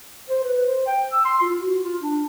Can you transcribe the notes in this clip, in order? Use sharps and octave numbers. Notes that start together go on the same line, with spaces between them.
C5
B4
C5
G5
E6
C6
F4
F#4
F4
D4